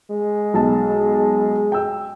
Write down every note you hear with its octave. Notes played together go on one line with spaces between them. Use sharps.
G#3
B1 A5
G5 E6